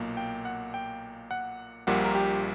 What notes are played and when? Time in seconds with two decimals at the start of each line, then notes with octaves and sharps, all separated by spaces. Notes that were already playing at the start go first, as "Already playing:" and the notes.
Already playing: B1 A#2 A#3
0.17 G5
0.45 F#5
0.74 G5
1.31 F#5
1.87 A#1 A#2 G3 A#3 F#5
2.05 A#4
2.15 G4